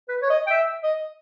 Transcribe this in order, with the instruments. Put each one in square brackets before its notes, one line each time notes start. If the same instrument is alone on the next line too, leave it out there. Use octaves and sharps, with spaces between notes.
[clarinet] B4
C#5
D#5
G5
E5
D#5